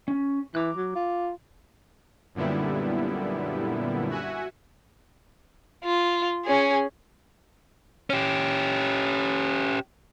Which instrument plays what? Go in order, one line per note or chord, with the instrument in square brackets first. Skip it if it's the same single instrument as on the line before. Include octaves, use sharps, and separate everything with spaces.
[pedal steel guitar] C#4
[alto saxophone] E3 [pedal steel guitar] A#5 D6 F#6
[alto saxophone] F#3
F4
[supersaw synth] F#2 A#2 D3 G3 B3 E4
F#4 E5 F#5 G#5
[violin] F4
C#4 G#4
[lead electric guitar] C#4 G4